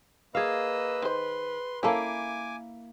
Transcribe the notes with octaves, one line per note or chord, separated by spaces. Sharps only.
A#3 G#4 B4 D#5 F5 E6
D#3 C5 C6
A#3 C#4 E4 A4 G#5 D6